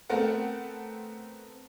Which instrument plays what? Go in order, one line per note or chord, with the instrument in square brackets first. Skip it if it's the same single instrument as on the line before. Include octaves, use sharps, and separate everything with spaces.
[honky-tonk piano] A3 B3 C4 A4 A#4 F#5